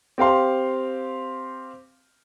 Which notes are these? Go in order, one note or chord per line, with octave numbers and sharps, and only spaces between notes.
C4 G4 F5 C6